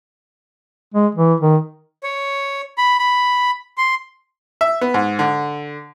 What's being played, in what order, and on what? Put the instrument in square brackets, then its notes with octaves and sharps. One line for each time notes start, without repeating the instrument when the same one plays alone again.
[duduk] G#3
E3
D#3
[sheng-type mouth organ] C#5
B5
B5
C6
[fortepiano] E5
B3
G#2
D3